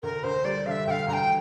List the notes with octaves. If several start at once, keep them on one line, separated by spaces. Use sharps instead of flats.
D2 A#4
D2 C5
G3 D5
D3 E5 F5
D2 F5 G5
D2 A#5
G5